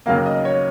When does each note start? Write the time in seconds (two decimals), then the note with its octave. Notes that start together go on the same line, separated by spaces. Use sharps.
0.06 D#2 C#3 F#3 A#3 F5
0.26 D#5
0.45 C#5